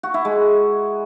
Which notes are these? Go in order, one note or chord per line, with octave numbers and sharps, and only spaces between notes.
F#4
E4
G#3